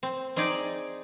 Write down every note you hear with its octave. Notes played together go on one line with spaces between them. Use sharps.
C4
C4 D#4 G#4 D5